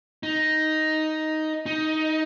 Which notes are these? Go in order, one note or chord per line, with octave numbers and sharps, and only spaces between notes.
D#4
D#4